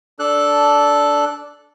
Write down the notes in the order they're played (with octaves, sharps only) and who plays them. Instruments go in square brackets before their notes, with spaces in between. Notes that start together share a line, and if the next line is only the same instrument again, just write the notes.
[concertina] D4 A4 F#6